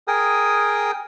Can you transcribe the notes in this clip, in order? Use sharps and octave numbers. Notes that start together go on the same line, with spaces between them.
G#4 A#4 G5 G#5 D#6